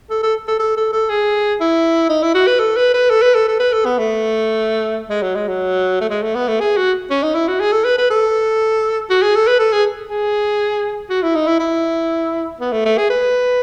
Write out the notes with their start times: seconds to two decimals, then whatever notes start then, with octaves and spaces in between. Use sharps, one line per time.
0.10 A4
0.23 A4
0.48 A4
0.60 A4
0.77 A4
0.93 A4
1.10 G#4
1.60 E4
2.10 D#4
2.23 E4
2.35 F#4
2.47 B4
2.60 A4
2.77 B4
2.94 B4
3.10 A4
3.22 B4
3.35 A4
3.48 A4
3.60 B4
3.73 A4
3.85 B3
3.98 A3
5.10 G#3
5.22 F#3
5.35 G#3
5.48 F#3
6.01 A3
6.09 G#3
6.22 A3
6.35 B3
6.48 A3
6.60 G#4
6.77 F#4
7.10 C#4
7.23 D#4
7.35 E4
7.48 F#4
7.60 G#4
7.72 A4
7.85 B4
7.98 B4
8.10 A4
9.10 F#4
9.22 G#4
9.35 A4
9.48 B4
9.59 A4
9.73 G#4
10.10 G#4
11.10 F#4
11.22 E4
11.35 D#4
11.47 E4
11.59 E4
12.60 B3
12.72 A3
12.85 A3
12.98 G#4
13.10 B4